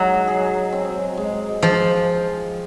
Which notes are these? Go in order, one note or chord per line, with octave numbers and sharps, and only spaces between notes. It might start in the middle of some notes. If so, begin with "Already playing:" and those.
Already playing: F#3 G#3 D#4 D#5
G#4
C4
G#3
F3 G#3